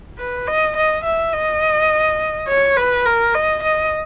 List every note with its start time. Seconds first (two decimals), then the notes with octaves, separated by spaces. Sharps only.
0.18 B4
0.47 D#5
0.76 D#5
1.04 E5
1.33 D#5
2.48 C#5
2.76 B4
3.05 A#4
3.34 D#5
3.63 D#5